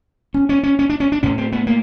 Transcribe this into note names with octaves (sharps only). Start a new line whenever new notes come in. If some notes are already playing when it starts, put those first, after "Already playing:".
C#4
C#4
C#4
C#4
D4
C#4
D4
A2 C#4
C4
B3
A#3